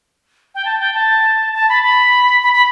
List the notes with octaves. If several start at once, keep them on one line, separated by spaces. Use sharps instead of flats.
G5
A5
G5
A5
A5
B5
B5
B5
B5